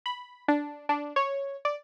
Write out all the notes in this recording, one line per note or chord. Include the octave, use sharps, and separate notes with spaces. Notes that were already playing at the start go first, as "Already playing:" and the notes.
B5
D4
D4
C#5
D5